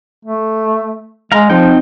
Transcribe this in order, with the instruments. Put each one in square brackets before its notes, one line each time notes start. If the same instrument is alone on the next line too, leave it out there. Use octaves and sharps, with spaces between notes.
[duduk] A3
[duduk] G#3 [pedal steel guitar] F5 A#5
[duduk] F3 [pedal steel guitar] C4 D#4 G5